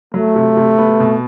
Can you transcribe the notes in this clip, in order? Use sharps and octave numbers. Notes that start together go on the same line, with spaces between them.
F#3 A3
C3
C3
B3
B2